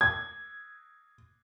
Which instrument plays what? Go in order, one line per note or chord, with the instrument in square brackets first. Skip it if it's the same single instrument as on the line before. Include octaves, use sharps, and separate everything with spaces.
[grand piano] G#6